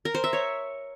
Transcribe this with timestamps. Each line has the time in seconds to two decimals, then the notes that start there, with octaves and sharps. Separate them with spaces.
0.05 A#4
0.14 C5
0.24 E5
0.33 C#5